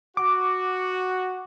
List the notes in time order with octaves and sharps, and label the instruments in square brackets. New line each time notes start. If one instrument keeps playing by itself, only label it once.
[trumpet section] F#4 [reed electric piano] D6